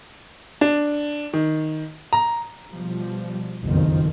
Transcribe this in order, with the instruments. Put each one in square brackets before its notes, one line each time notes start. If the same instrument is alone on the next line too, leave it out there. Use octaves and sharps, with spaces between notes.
[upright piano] D4
D#3
A#5
[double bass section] B2 F3 G3
F#1 B1 F2 D#3 F3